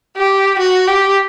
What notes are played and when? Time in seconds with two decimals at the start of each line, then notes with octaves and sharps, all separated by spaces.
0.17 G4
0.59 F#4
0.87 G4